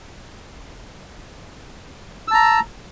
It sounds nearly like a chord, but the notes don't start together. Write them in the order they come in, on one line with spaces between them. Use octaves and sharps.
E6 A5 A#5